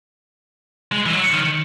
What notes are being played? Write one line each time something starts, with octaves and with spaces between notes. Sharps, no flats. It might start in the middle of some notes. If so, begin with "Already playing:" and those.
G#3
E3
F#3
D#3